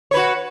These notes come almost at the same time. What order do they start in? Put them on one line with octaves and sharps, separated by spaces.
C#5 B4 F#4